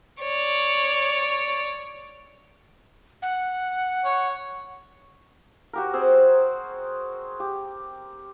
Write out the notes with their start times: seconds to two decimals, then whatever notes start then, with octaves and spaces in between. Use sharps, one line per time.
0.20 C#5 D5
3.22 F#5
4.05 C#5
5.73 F#4 G4 A#4
5.93 C4 G#4 C5
7.40 G4